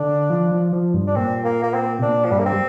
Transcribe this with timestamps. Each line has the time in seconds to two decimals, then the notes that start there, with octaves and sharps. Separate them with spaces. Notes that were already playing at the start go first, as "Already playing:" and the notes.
Already playing: D3 D4
0.30 F3
0.52 F3
0.73 F3
0.94 G2
1.07 D4
1.16 A#2 C4
1.44 A#3
1.63 A#3
1.74 C4
1.99 C3
2.02 A#2 D4
2.25 F3
2.31 G2 G3
2.39 A#3
2.45 C4
2.53 G3